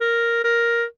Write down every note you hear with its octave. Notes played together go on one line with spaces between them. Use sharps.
A#4
A#4